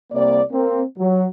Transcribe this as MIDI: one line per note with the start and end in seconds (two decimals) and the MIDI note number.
0.12 0.41 36
0.12 0.41 58
0.12 0.41 74
0.52 0.80 58
0.52 0.80 60
0.98 1.25 54